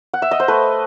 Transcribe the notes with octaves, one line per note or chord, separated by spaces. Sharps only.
F#5
E5
D#5
C5
A3 B4